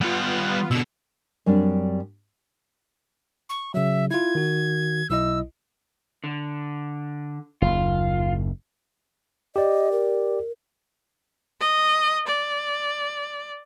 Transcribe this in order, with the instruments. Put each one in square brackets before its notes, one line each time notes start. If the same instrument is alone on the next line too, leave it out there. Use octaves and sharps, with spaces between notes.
[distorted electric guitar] G3 F#5 [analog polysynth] B3 F4
[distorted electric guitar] B2 D3 [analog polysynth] E6
[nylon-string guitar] F#2 G3 C4 D4
[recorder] C#6
[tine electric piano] C#3 F#3 [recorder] E5
[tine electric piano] E4 F4 [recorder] G#6
[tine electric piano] D#3 F#4
[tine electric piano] B1 E4 D#5 [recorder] E6
[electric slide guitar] D3
[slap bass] F#1 D#2 [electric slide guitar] F4
[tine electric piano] G4 D5 [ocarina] D#5
[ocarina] A#4
[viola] D#5
D5